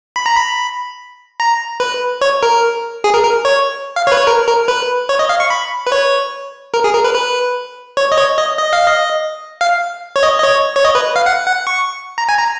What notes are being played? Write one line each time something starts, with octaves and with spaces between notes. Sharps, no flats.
B5
A#5
B5
A#5
B4
C#5
A#4
G#4
A#4
A#4
C#5
F5
C#5
B4
C#5
A#4
A#4
B4
C#5
D#5
F5
C#6
B5
B4
C#5
A#4
G#4
A#4
B4
B4
C#5
D#5
C#5
D#5
D#5
F5
D#5
F5
C#5
D#5
D#5
C#5
C#5
D#5
B4
F5
F#5
F#5
C#6
A#5
G#5
A#5